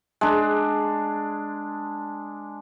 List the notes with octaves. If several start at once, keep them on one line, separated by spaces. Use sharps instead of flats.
G#3 D4